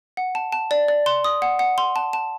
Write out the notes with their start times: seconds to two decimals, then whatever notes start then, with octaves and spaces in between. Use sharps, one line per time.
0.17 F#5
0.35 A5
0.52 A5
0.71 D5
0.88 D5
1.06 C6
1.24 D#6
1.42 F#5
1.59 F#5
1.78 C6
1.96 A5
2.13 A5